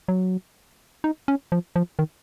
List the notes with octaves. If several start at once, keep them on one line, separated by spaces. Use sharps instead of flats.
F#3
D#4
C#4
F3
F3
D#3